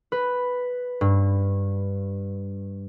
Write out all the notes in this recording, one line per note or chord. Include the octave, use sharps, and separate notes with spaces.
B4
G2